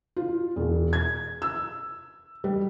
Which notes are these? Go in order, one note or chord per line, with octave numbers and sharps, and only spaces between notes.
F4
E1
G#6
E6
G3